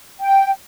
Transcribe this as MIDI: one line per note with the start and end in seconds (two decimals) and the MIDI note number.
0.20 0.50 79